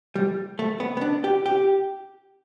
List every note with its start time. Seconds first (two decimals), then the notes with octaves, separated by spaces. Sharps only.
0.15 G3
0.59 A3
0.80 B3
0.97 B3
1.01 D4
1.24 G4
1.46 G4